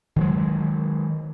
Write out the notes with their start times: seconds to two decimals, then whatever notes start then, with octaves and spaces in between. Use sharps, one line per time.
0.16 D#3 F#3 G#3